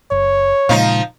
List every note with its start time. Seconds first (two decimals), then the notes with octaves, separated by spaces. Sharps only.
0.11 F#1 C#5
0.69 A#2 C#3 F3 G#3 D#4